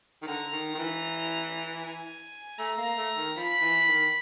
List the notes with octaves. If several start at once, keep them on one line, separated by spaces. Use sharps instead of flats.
D#3
D3 A#5
D#3
D#3
E3
G#5
A3 A#5
A#3
A3
D#3
F3 B5
E3
D#3